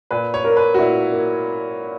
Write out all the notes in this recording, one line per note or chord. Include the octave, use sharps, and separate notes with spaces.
A#2 B4
C#5
A#3 A#4
B4
F#4
A#2 E4
A#3